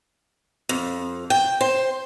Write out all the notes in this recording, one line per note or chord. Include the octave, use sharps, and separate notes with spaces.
F2
G5
C5